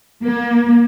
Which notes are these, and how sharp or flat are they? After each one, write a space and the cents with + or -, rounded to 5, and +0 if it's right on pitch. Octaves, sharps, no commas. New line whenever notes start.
A#3 +35